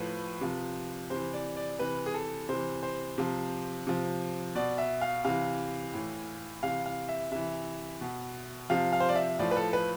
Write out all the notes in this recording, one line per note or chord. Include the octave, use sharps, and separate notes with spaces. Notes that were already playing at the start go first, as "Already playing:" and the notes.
Already playing: A2 F3 B4
C3 F3
C3 E3 C5
D5
D5
C3 E3 B4
G#4
A4
C3 E3 C5
C5
C3 F3
C3 F3
B2 D5
E5
F5
C3 E3 F5
A2 E3
C3 E3 F5
F5
E5
C3 E3 E5
B2
C3 F3 F5
F5
C5
D5
E5
A2 F3 D5
B4
A4
B4